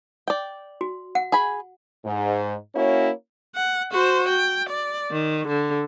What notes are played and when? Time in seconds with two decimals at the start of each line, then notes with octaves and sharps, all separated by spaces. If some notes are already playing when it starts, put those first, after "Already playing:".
0.28 D5 G5
0.81 F#4
1.15 F#5
1.32 G#4 G#5 B5
2.05 G#2
2.75 A#3 C#4 E4 F#4 C#5
3.56 F#5
3.92 F#4 C5
4.29 G5
4.70 D5
5.11 D#3
5.48 D3